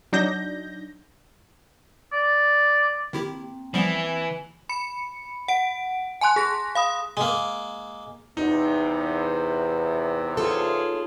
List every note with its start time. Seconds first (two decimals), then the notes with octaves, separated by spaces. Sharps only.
0.13 F#3 D4 D#4 G6 A#6
2.12 D5
3.13 D#3 A#3 C4 E4 G4 G5
3.74 E3 F3 G3 B3 G#5
4.69 B5 C#7
5.48 F#5 D7
6.21 G#5 A5 C6 F#6
6.36 G#4 A#6
6.75 F5 B5 D#6
7.17 G#3 A#3
8.37 E2 C3 D#4
10.37 F4 G#4 A4 C#5